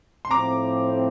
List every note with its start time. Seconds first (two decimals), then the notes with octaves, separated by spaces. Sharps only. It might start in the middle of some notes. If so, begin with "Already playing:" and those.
0.25 C6
0.31 A2 F3 A3 C4 A#5 D6